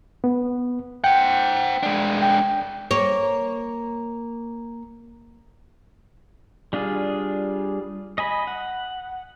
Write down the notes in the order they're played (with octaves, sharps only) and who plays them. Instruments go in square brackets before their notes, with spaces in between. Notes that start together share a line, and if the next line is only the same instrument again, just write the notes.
[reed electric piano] B3
[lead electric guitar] C5 F#5 [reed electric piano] G5
[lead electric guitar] G#3 D4
[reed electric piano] G5
[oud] A#3 C#5
[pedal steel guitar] G3 D4 F4 G#4
D#5 G#5 B5
F#5